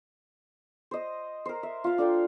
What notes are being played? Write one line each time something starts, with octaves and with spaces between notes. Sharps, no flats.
C5 D#5
A#4 C5
E5
F4 F5
D4 A4 F5 G5